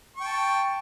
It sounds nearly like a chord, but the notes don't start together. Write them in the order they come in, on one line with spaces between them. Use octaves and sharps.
C#6 G5 A5